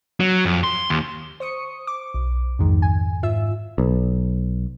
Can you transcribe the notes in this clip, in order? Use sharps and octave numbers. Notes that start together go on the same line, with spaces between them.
F#3
F2
C6
D#2
C5 C#6 D#6 C#7
D6
B1
F2 G#2 D#3 G#3
G#5
G#2 F4 E5 E6
B1